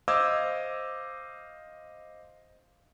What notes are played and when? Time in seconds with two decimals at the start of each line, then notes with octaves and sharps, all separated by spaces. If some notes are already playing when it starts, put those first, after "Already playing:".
0.08 C5 D#5 F5 D6 E6 G#6